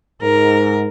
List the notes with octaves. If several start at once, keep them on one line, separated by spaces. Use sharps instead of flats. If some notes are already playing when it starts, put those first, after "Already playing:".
G#2 A#4